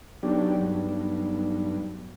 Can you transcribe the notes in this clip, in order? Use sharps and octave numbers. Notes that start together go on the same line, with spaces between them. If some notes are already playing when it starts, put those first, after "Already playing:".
B1 F#3 D4 G4
B1 G2